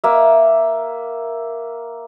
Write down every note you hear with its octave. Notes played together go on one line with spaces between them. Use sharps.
A#3 E5